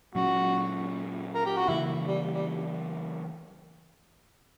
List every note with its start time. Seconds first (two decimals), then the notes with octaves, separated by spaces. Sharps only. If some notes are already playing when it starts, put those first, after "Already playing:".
0.15 A#2 F#3 C#4 F#4
1.34 A#4
1.46 G4
1.57 F#4
1.68 C#3 E3 A#3 E4
2.07 G3
2.33 G3